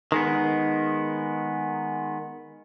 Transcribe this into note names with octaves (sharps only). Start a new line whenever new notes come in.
D#3 G#3 B3